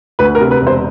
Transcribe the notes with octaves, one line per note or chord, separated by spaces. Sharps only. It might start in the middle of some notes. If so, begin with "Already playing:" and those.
D2 B4
A#4
C3
B4
E1
C5